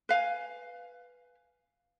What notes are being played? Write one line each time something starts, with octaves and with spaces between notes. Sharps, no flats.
B4 F5 G#5